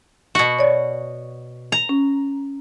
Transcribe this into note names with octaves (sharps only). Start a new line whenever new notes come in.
B2 F#4
C#5 D5
A#5
C#4